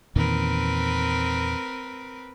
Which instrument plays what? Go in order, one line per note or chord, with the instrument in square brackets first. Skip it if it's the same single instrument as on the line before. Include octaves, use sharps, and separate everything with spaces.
[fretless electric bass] E2 A#2 D#3 [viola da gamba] C4 A#4 B4